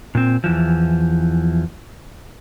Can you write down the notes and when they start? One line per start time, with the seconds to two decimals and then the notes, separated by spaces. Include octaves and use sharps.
0.15 A#2 C4
0.44 E2 E3 F3